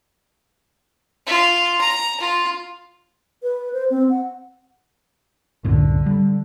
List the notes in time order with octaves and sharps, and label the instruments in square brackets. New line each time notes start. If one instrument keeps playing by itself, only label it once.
[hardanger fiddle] F4
A#5
F4
[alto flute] B4
C5
C4
F#5
[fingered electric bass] C2 F#2 A2 [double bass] D3
[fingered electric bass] G3